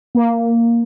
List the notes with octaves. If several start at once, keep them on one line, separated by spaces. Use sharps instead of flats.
A#3